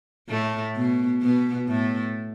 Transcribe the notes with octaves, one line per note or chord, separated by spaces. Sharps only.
A2 A3
B2 B3
B2 B3
A2 A3